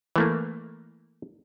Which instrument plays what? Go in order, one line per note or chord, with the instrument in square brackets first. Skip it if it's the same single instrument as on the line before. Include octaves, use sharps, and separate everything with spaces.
[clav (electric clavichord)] E3 A3 A#3